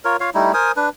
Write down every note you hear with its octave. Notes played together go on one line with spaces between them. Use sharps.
F4 A#4 C#5
F4 C#5 F5
G3 A3 D#4 E4
A#4 C5 G#5 D#6
D4 B4